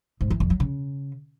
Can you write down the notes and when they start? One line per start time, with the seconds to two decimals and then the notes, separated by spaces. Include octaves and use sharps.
0.21 G#2
0.30 E3
0.40 F2
0.50 F#3
0.60 C#3